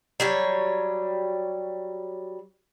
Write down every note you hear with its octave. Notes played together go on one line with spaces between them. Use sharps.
F#3 G3 C#5